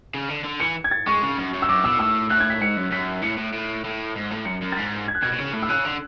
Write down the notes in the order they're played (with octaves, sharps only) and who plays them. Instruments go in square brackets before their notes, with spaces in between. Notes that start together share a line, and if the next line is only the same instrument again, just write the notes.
[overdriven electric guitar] C#3
D3
D3
[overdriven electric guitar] E3 [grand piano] C#7
[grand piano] G#6
A6
[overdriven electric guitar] G#3 [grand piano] C#6
[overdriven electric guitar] C#3
F#2
F#2
[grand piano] E6
[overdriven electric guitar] F#2 [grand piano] D6
[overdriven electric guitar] B2 [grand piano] E6
[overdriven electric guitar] A2 [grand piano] E6
[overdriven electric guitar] A2 [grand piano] F#6
[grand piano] G#6
B6
[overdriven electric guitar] G#2 [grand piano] C#7
[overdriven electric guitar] F#2
[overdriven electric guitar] F#2 [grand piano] B6
[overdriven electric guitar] A2 [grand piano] C#7
[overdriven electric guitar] A2
A2
A2
G#2
A2
[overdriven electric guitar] F#2 [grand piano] C#7
[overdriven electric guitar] F#2
[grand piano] A6
[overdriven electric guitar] G#2 [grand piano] B6
[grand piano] G#6
F#6
[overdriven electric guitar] B2 [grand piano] G#6
[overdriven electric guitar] B2
C#3
A2
[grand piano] E6
[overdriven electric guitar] C#3 [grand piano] F#6
[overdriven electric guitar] D3